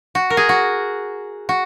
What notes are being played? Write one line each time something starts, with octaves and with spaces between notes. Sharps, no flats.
F#4
A#4
G#4
F#4
F#4